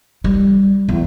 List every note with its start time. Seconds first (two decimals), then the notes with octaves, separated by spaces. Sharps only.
0.24 G3
0.89 E2